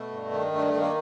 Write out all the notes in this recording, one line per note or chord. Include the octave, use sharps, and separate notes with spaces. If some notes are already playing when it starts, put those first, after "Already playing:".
Already playing: B2 A3
G2
D#3
G2 A3
A3
D#3
A#3